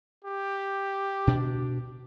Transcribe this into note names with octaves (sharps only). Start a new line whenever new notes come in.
G4
B2 D4